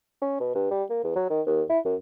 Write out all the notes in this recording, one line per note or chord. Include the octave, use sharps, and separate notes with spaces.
C#4
B2
G2
G3
A#3
E2
F#3
D#3
D#2
E4
F#2